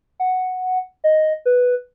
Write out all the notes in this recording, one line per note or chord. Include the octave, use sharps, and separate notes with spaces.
F#5
D#5
B4